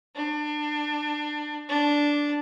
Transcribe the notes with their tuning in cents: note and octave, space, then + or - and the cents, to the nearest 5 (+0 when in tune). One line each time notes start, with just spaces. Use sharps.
D4 +25
D4 -5